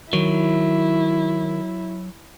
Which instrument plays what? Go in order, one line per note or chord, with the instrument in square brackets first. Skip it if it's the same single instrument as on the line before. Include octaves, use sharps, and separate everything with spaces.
[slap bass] D#3 [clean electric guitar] F#3 [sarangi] E4